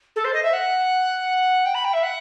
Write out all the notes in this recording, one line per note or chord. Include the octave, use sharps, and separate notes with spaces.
A4
C5
D#5
E5
F#5
G5
B5
G5
E5
F#5